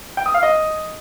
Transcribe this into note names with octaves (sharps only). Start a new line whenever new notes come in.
G5
D#6
F5
D#5